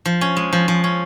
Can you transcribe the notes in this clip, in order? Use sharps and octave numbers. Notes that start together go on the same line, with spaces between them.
F3
C#4
G#3
F3
F3
C#4